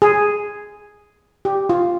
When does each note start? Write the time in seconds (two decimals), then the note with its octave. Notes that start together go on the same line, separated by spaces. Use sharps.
0.02 G#4
1.45 G4
1.69 F4